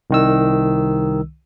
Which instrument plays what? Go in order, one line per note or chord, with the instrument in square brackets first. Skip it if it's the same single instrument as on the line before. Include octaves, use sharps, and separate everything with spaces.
[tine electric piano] C2 D#3 E6